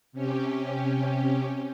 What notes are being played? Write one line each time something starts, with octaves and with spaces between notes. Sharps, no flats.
C3 C#4 G4